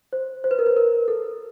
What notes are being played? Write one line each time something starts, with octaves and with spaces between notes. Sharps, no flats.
C5
C5
B4
A#4
B4
A#4
A4